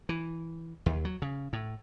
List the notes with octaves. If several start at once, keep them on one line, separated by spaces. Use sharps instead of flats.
E3
D#2
F#3
C#3
A2